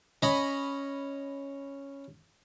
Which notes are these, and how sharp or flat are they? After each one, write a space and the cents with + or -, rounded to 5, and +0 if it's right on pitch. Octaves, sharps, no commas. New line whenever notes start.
C#4 +0 D#5 +0 B5 +0